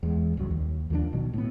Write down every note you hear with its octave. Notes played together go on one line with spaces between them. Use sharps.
E2 G#3
C#2 G2 F#3
D#2
D#2 F3 G3 D4
A#1 B2 D#3 F#3
A2 B3